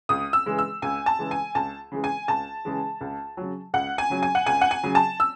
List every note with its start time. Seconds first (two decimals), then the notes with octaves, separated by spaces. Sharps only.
0.09 C#2 D#6
0.33 E6
0.46 C#3 E3 G#3
0.58 E6
0.82 C#2 G#5
1.06 A5
1.19 C#3 E3 G#3
1.31 G#5
1.55 C#2 A5
1.92 C#3 E3 G#3
2.04 G#5
2.28 C#2 A5
2.65 C#3 E3 G#3
3.01 C#2
3.37 C#3 F#3
3.74 C#2 F#5
3.98 G#5
4.10 C#3 F#3
4.23 G#5
4.35 F#5
4.46 C#2 G#5
4.61 F#5
4.71 G#5
4.83 C#3 F#3
4.95 A5
5.20 E6